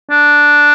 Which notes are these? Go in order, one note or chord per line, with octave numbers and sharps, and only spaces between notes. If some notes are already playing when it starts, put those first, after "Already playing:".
D4